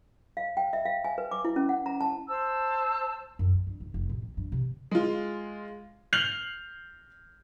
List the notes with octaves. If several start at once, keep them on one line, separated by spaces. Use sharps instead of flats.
F5
G5
E5
F5
G#5
B4
D6
E4
C#4
F#5
A#5
A5
C5 A5 E6
F#2
G#3
G2
F1
F1
A1
C4
G2
C3
G#3 F4
F6 G6 C7 F7 F#7